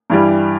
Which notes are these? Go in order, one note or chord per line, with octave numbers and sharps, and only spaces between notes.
G2 E3 G3